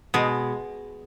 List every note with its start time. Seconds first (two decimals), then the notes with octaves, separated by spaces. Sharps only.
0.14 B2 G#3